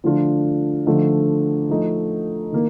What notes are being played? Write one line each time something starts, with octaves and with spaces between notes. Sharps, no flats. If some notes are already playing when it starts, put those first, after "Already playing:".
D3 F3 A3 D4 F4
D3 F3 A3 D#4
F3 A3 D#4
D#3 A#3